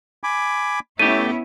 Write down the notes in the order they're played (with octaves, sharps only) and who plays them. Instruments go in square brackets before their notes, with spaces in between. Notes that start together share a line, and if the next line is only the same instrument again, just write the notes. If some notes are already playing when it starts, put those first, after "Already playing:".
[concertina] G#5 B5 D6
[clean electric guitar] A3 G4 [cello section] B3 C#4 E4 [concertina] C#5 [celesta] D#7